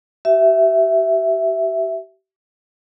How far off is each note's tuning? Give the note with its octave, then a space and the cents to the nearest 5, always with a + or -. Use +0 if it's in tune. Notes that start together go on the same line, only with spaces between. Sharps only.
G4 -35 E5 +0